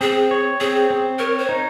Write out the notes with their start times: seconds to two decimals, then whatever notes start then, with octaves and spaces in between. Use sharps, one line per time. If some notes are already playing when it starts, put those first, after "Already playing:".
0.01 C4 G#4
0.31 C#5
0.60 C4 G#4
0.90 C4
1.19 A#4 C#5
1.39 C5
1.49 D#4